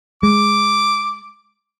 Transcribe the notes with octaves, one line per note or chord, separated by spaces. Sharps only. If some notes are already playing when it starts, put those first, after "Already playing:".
G#3 D6